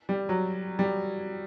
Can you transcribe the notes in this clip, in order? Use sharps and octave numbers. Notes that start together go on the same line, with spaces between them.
G3
F#3
G3